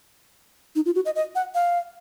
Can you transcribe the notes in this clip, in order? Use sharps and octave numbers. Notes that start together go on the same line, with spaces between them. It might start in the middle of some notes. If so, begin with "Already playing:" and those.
D#4
F4
F#4
D#5
D#5
F#5
F5